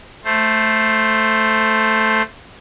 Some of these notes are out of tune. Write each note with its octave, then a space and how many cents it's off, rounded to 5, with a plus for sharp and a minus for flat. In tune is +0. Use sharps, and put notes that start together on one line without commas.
A3 +0 C5 +0